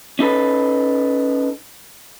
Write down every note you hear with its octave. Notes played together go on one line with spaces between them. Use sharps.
C#4 D#4 A4 B4